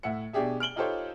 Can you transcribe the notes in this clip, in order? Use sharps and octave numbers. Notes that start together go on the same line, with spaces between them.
A2 E5 F#5 C#7
B2 D4 G4 G#4 E5
F6 D7 F#7 G7
D#4 F4 G4 A4 C5 C#5